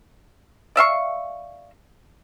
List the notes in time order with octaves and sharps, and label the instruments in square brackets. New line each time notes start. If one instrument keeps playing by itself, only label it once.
[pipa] D5 E5 F5 C#6